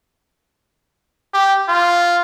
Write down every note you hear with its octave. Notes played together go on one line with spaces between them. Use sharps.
G4
F4